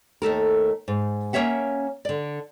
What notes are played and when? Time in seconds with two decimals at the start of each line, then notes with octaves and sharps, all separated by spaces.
0.22 D#2 A3 A4 A#4
0.88 G#2
1.33 A#3 C#4 C#5 E5 F#5
2.05 D3 D5